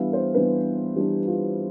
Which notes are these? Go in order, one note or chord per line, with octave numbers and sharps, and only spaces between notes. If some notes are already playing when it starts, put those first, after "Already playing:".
Already playing: E3 G3 B3 D4 E5 F5
C5
E3 G3 B3 D4 B4
E3 G3 B3 D4 G4
F4